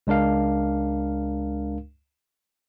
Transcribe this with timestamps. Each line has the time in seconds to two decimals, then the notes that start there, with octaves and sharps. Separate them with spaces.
0.07 C#2 G#3 D4 A#4 F5